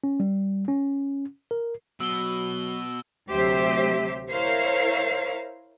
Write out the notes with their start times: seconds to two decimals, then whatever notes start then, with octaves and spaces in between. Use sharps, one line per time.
0.04 C#4
0.20 G3
0.68 C#4
1.51 A#4
2.00 B2 F#3 E6 G7
3.29 D2 C3 F#3 G4 C5 E5
4.30 E4 A#4 C5 C#5 F5